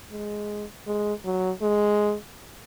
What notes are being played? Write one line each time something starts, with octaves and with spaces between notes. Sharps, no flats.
G#3
G#3
F#3
G#3